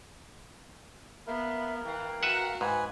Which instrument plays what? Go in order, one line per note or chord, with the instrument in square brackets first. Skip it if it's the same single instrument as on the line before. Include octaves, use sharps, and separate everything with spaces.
[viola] B3 [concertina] A#4 [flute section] E5 F5 B5
[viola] E3 [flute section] F5 G5
[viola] F#4 A#5 [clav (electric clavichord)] B4 E5 F#5
[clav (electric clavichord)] G#2 [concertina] B4 G#5